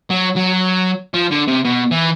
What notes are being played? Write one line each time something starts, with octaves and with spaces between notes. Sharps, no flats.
F#3
F#3
F3
D3
C3
B2
E3